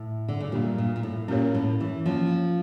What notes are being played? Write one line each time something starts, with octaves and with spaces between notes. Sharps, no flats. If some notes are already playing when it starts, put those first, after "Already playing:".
Already playing: A2
D3
C#3
A#2 G3 D4 G4
A#2
A#2
A2
A#2 C#4 G4 A#4 C#5
A2
E3
F3 A#3 C#4 F4 C#5